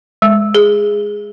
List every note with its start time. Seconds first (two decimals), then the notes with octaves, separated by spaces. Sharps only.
0.22 G#3
0.55 G#4